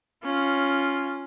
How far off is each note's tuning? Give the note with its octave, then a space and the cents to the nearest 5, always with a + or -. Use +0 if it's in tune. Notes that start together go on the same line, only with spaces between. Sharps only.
C#4 +0 F4 +0